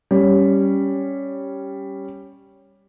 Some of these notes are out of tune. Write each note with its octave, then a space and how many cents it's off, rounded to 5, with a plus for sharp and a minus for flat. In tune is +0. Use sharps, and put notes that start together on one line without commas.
G3 +0 C#4 +0